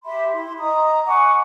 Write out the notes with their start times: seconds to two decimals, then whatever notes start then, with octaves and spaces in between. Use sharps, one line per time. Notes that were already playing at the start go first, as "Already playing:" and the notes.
0.05 G4 E5 B5 C6
0.33 E4 C6
0.59 D#5 A#5 D#6
1.06 F#5 G#5 C#6 D6